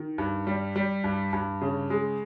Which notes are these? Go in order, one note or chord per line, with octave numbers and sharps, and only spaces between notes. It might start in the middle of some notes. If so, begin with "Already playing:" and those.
Already playing: D#3
G2
G3
G3
G2
G2
C#3
G#3